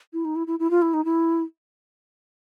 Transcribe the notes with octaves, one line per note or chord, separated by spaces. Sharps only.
E4
D#4
E4
E4
E4
F4
E4
D#4
E4